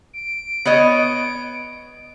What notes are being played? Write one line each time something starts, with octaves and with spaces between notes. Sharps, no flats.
D7
B3 C#5 D#5